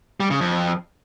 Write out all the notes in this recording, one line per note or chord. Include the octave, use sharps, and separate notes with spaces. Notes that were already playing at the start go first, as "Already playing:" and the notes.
G3
C#3
F2